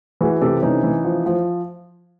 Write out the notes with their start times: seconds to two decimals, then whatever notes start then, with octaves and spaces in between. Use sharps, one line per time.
0.21 E3 F#4 G#4
0.41 C3 G4 A4
0.62 E3 C#4 D#4
0.84 E3
1.05 F3
1.26 F3